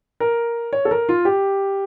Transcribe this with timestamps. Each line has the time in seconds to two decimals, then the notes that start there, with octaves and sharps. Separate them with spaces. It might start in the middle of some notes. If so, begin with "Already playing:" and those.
0.20 A#4
0.73 C#5
0.85 A4
0.91 A#4
1.09 F4
1.25 G4